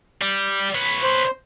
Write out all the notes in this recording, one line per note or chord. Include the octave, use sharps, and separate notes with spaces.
G3
B4 C#5
C5